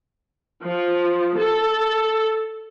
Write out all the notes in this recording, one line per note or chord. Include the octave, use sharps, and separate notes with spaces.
F3
A4